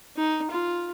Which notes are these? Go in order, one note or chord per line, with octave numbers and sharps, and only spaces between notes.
D#4
F4